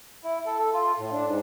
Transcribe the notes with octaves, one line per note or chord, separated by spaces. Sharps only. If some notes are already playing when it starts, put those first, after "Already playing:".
E4
A4
A4
F4
A2
D4
G#2